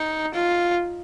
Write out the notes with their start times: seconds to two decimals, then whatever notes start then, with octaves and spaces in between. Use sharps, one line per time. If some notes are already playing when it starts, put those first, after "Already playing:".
Already playing: D#4
0.34 F4